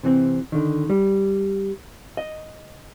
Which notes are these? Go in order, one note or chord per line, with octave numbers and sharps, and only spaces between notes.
C3 E3 C4
D3 D#3
G3
D#5